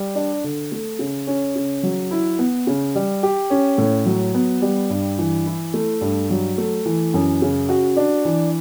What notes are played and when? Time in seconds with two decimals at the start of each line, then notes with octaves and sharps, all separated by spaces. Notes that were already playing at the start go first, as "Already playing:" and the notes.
Already playing: G3
0.15 D4
0.44 D3
0.72 A3
0.99 C#3
1.27 C#4
1.56 C#3
1.83 F#3
2.11 E4
2.39 B3
2.67 C#3
2.95 G3
3.23 G4
3.50 C#4
3.78 A2
4.06 F#3
4.34 B3
4.62 G3
4.90 G2
5.18 E3
5.46 E4
5.74 A3
6.01 G2
6.30 F#3
6.58 A3
6.85 E3
7.14 F#2
7.42 C#3
7.69 F#4
7.97 D4
8.25 E3